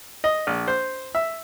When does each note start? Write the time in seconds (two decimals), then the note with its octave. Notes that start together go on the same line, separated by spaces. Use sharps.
0.24 D#5
0.47 A#1
0.68 C5
1.15 E5